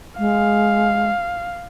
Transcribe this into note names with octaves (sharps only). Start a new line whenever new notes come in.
G#3 F5